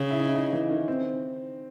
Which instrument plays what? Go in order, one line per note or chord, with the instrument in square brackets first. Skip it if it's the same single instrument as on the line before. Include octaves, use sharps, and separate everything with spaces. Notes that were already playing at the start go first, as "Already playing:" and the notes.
Already playing: [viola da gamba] C#3
[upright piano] E4
D#4
E4
D#4
E3
D#3
C4